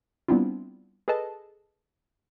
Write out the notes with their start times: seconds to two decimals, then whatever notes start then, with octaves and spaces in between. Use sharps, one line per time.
0.28 G3 B3 C4 D4 E4 F4
1.08 G#4 A4 B4 D#5 A5